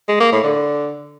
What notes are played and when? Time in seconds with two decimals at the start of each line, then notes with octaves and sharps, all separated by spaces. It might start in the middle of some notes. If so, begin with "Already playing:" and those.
0.09 G#3
0.20 A#3
0.32 A2
0.44 D3